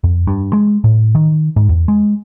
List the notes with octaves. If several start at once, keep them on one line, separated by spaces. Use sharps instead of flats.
F2
G2
G#3
A2
D#3
G#2
E2
G#3